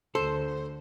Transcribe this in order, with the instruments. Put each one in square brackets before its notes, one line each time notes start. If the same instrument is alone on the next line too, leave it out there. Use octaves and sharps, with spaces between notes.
[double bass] D2 D3 [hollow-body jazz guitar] A4 [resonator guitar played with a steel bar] C5